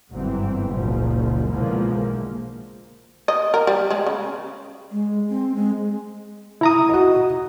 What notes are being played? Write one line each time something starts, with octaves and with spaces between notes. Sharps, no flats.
G1 G#2 E3 F#3 C4
F#1 C#2 A#2 C#3 F3 F#3
B1 D3 E3 F3 G#3 A#3
D#5
A#4
G3
G#3
C#3
G#3
C4
G#3
E4 A#5 D#6
F#4 D#5